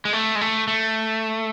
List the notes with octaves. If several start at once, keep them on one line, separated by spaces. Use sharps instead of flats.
G#3
A3
G#3
A3
A3